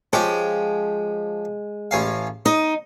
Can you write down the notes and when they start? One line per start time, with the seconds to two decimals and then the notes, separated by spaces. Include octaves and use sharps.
0.13 F3 G#3 C#4 G4
1.91 A1 C#4 F5
2.46 D#4 D#5